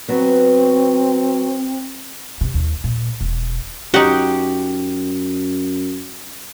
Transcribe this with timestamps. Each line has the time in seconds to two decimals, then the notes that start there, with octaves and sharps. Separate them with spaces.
0.09 F#3 B3 C4
2.41 C3
2.54 D#2
2.84 A#2
3.21 E1
3.94 F#2 D#4 F#4 G4